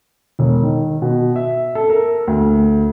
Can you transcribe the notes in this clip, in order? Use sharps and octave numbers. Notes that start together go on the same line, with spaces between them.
E1
D#3
B2
E5
A4
A#4
D2